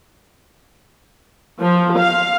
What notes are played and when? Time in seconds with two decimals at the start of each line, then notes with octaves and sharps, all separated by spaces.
1.60 F3
1.96 F5